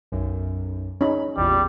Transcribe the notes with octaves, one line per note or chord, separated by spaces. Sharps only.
B1 F#2
C#4 D#4 B5
A1 E2 A#2 G3